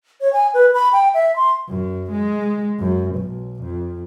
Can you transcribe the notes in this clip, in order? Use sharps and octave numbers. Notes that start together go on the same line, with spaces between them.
C#5
G#5
B4
B5
G5
E5
C6
F#2
G#3
F#2
B1
F2